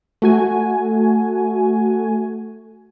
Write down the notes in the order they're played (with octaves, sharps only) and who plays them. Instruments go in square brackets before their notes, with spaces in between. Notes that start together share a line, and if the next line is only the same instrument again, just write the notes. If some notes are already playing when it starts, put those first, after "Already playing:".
[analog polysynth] A3 F#4 G#5